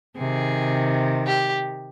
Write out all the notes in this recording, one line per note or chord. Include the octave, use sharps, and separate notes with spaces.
C3 D#3 G#4
G4